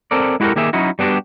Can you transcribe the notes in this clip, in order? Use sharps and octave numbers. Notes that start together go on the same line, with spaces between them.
C4 A4 A#4 D5
G#3 E4 F#4 G4 A4 A#4
D#3 A#3 G4 G#4 E5
F#3 C#4 D#4 E4 F#4
G3 B3 D4 F#4 G4